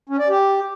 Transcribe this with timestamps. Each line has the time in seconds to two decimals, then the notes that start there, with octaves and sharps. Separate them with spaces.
0.09 C#4
0.19 D5
0.29 G4